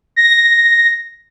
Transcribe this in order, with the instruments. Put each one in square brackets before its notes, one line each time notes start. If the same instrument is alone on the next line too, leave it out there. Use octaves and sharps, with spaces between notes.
[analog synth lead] A#6